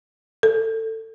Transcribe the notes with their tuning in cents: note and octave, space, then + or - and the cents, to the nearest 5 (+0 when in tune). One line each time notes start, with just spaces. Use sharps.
A4 +20